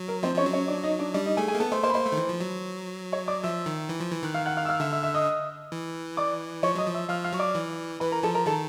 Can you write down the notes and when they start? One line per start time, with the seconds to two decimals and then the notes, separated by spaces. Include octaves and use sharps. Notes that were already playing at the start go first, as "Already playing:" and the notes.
Already playing: F#3
0.08 A#4
0.23 F3 C4 C5
0.35 F3 C#4 C#5
0.46 F#3
0.53 C#4 C#5
0.68 D4 D5
0.83 D#4 D#5
0.99 D4 D5
1.14 G3 D4 D5
1.26 D#4 D#5
1.37 A3 G#4 G#5
1.48 G#4 G#5
1.55 A#3
1.60 B3 A4 A5
1.71 A3 C5 C6
1.83 A#3 C5 C6
1.90 B5
1.95 A#3 C5 C6
2.05 A3
2.12 D#3
2.17 E3
2.29 F3
2.41 F#3
3.12 C#5 C#6
3.28 D5 D6
3.43 F3 E5 E6
3.66 D#3
3.89 E3
4.00 F3
4.12 E3
4.23 D#3 F#6
4.34 F5 F6
4.46 F#5 F#6
4.57 F5 F6
4.65 E6
4.68 F5 F6
4.80 D3 E5 E6
4.91 E5 E6
5.03 E5 E6
5.14 D#5 D#6
5.72 E3
6.17 D5 D6
6.63 F3 C#5 C#6
6.75 F#3 D#5 D#6
6.87 F3
6.94 E5 E6
7.09 F3 F5 F6
7.24 F5 F6
7.33 F#3 C#6
7.39 D5 D6
7.55 E3
8.00 E3 B4 B5
8.12 A#4 A#5
8.23 F3 A4 A5
8.34 A#4 A#5
8.46 D#3 A4 A5